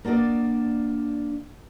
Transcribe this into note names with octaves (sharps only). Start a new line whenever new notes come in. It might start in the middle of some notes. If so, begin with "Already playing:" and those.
A#3 D4 F#4 D5 D#5